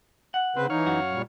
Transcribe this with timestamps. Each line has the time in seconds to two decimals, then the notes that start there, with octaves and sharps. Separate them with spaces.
0.34 F#5
0.56 C#3 C4 B4
0.70 E3 D#4 C#5 F5
0.86 F#2 F#4
1.12 A#2 G3